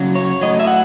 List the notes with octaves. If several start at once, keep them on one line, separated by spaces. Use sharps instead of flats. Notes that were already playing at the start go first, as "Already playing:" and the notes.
Already playing: F#2 C#3 F#3
C#5
A2 F#3 D#5
E5
F#5